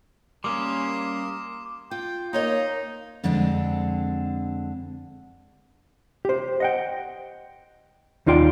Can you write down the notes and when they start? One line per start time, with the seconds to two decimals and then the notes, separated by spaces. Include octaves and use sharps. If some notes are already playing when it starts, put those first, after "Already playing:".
0.44 G3 A#3 C#4 A#4 C6 D6 D#6
1.91 F4 G5
2.33 A#3 D#4 C5 C#5 D#5
3.24 F2 D3 G#3 C4 D4
6.25 G4 C5
6.60 D#5 F#5 G5
8.26 D#2 D#4 F4 D5 G5